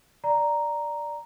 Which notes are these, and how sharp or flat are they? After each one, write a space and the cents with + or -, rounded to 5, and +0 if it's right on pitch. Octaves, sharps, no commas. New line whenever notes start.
D5 +0 A#5 +0